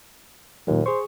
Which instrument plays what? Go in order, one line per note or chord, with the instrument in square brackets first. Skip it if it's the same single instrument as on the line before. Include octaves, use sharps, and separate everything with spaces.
[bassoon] D#2 [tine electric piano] A#2 D#3 F#3
[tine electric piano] G#4 C#6 [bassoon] C5